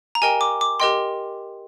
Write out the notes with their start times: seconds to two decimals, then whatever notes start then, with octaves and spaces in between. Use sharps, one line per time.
0.15 A#5
0.22 G4 A#4 D#5 G5 G#5
0.41 D6
0.61 D6
0.80 G4 A#4 D#5 G5 C6